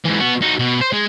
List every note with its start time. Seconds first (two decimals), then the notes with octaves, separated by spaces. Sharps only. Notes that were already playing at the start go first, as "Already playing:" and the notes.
0.05 G#2 E3
0.20 B3 F#4
0.42 D#4 F#4
0.59 B2
0.81 C5
0.93 G#3